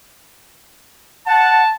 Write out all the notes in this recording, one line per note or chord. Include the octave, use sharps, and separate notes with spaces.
F#5 A5